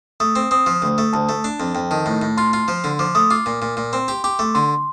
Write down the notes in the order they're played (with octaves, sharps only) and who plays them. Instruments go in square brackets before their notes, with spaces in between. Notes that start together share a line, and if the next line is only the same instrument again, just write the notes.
[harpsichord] A3 [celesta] D#6
[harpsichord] C4
[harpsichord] C4 [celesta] D#6
[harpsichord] F3
D2
A3
[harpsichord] D2 [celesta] A5
[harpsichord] A3
D4
F2
[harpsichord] F2 [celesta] G5
[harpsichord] D#3 [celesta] A5
[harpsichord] A2
A2
[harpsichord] F4 [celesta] C6
[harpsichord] F4
F3
D3
[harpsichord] F3 [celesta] D6
[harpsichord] A3 [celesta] D#6
[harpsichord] F4 [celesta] D6
[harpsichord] A#2
A#2
A#2
[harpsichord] C4 [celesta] C6
[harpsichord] G4
[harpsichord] G4 [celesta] D6
[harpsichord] A3 [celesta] D6
[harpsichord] D3 [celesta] C6